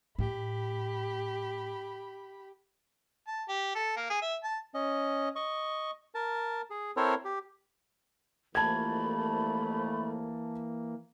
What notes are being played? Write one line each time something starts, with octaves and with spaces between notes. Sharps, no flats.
A2 G4 B5
A5
G4
A4
A#3
G#4
E5
A5
C#4 D#5
D#5 C#6
A#4 A5
G#4
C4 E4 A4 A#4 C5 C#5
G4
C2 F2 E3 A3 A#3 A5 B5 G#6